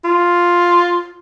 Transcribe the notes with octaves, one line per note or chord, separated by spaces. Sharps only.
F4